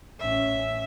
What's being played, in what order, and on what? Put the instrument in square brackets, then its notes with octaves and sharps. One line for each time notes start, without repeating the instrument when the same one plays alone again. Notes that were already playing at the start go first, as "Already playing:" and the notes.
[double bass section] A1 C#4 [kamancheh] E5